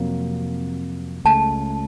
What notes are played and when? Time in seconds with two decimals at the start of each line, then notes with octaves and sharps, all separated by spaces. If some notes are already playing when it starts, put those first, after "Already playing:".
Already playing: F2 C3 F#3 A#3
1.25 C#2 C#3 A3 A5